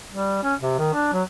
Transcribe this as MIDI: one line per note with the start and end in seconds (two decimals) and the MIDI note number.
0.11 0.39 55
0.43 0.54 61
0.61 0.76 48
0.79 0.91 51
0.94 1.10 62
1.13 1.23 54